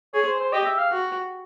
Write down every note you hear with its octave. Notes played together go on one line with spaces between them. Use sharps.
G#4 C#5
C5
C5
G4 D#5
E5
F5
F#4